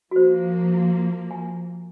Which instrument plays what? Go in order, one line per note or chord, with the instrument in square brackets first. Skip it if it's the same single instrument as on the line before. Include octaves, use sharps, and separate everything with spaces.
[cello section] F3 A#3 [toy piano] F#4 C5
[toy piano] G#5